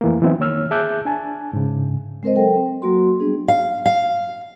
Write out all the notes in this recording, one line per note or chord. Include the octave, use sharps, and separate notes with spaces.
F2 E3 A3 A#3
E3 F#3 B3 C4 D#4 E4
D#3 A#3 C#5 E6 F6
G#4 E5 A5 D6 F#6 G6
D4 G#5 A5
G#2 C#3
G#3 C4 A#4 C5 D#5
F#3 A4 A#4 G5
C4
F#3 A#3 F#4 C6
G3 B3 D4 G#4
F5
F5